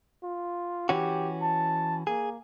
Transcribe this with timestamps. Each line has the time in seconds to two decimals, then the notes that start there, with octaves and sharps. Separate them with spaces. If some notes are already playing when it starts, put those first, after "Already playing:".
0.23 F4
0.89 E3 C#4 F#4 G4
1.42 A5
2.07 A#3 G#4